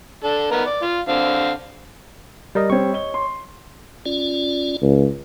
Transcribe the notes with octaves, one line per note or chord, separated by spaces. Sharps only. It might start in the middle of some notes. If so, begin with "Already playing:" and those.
D4 A4
B3 D#4 A#4
D5
F4
D3 C4 F5
G3 A#4 D#5
G3 C4 C#5 C#6
D#5 G7
C6
C#4 F4 D5
C#2